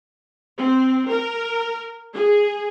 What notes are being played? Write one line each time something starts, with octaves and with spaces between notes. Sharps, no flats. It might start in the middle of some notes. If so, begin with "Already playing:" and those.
C4
A#4
G#4